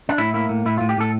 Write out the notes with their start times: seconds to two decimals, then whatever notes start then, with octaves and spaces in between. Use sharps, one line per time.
0.09 D4
0.18 A2 E4
0.34 A#3 E4
0.49 A2
0.65 A2 E4
0.78 F4
0.81 A2
0.89 G4
0.97 A2 A4